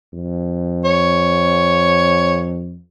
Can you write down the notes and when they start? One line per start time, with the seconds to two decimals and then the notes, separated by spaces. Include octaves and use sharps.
0.13 F2
0.84 C#5